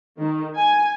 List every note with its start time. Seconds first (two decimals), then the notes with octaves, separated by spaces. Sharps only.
0.19 D#3
0.56 G#5